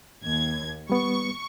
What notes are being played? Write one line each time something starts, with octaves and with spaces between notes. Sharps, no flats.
D#2 G#6
G3 B3 C#6